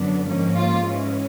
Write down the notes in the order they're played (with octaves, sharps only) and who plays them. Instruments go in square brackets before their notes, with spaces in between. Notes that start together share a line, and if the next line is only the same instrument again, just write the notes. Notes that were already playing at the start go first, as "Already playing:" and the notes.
Already playing: [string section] F#2 D3 F#3 B3 D4
G#2 F3 A#3 C#4 F4
F4
G#2 E3 G#3 C#4